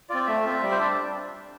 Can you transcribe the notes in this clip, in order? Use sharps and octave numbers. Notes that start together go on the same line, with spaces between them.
C4 F4 D5
A3 E5
C4 F4
G3
C5
D4 D5